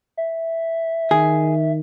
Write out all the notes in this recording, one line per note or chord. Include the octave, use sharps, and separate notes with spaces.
E5
D#3 G#4